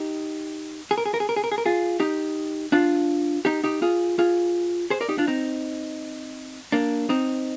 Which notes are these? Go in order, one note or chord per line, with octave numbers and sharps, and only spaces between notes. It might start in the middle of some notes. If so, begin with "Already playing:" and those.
Already playing: D#4 G4
G#4
A#4
G#4
A#4
G#4
A#4
G#4
A#4
G#4
A#4
F4 G#4
D#4 G4
D4 F4
D#4 G4
D#4 G4
F4 G#4
F4 G#4
G#4 C5
A#4 D5
D#4 G4
D4 F4
C4 D#4
A#3 D4
C4 D#4